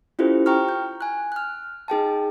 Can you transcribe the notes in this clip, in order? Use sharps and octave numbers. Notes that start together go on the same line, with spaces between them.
C#4 E4 F4 G4 A4 C5
G5 A#5 C#6 F6
G6
G#5 F#6
F6 F#6
D#4 G#4 G5 A5